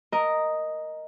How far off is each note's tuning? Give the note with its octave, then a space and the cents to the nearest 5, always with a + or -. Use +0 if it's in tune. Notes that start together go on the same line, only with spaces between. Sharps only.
A#4 +0 D#5 +0 A#5 +0